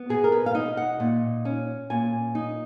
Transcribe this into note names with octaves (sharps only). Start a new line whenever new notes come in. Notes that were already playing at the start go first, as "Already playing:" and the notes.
Already playing: B3
B2 G#4
A#4
B4
F5
D#4 D#5
F#5
A#2
C#4
A#2 G#5
D#4